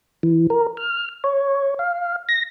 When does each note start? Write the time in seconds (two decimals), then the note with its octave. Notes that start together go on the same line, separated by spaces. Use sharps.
0.23 E3
0.50 A#4
0.77 F6
1.24 C#5
1.79 F5
2.29 A#6